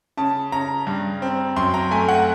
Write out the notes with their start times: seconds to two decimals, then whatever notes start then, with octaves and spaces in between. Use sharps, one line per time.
0.17 C#3 A5
0.52 C#3 A#5
0.87 G2
1.22 C4
1.56 F#2 C6
1.74 A#5
1.91 A3 G#5
2.09 F#5